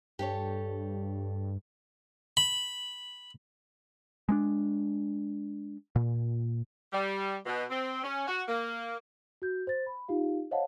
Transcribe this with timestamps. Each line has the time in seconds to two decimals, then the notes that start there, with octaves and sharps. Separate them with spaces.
0.19 G2 G4 A4 C#5
2.37 B5
4.29 G#3 A#3 D4
5.96 A#2
6.93 G3
7.46 B2
7.70 C4
8.03 C#4
8.27 F#4
8.48 A#3
9.42 F#4 G6
9.67 C5 A6
9.87 B5
10.08 D#4 F4 G4 F5
10.51 C5 C#5 D#5 F5 F#5 A5